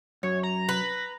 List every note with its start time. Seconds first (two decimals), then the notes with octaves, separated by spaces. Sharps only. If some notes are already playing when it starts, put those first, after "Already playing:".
0.23 F#2 C#5
0.43 A#5
0.69 B4